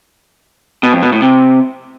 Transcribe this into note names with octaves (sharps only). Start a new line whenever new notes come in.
B2
F2
B2
A2
C3